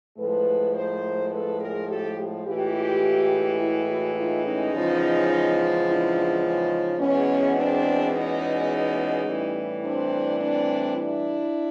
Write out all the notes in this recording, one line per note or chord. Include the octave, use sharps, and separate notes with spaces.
A2 F3 G#3 A4 B4
A#4 C5
A4 B4
G#4 A#4
G4 A4
A2 E3 G#3 F4 G4
E4 F#4
E4 F#4
D#4 F4
C#4 D#4
E2 C#3 F3 G#3
D4 E4
C#4 D#4
E2 B2 G#3 B3 C#4
C4 D4
C#4 D#4
A2 E3 G3
C4 D4
C4 D4
D4 E4